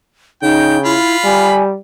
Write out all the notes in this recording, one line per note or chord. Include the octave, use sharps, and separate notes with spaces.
C#3 D#4 G5
E4 F4 B5
G3 G#5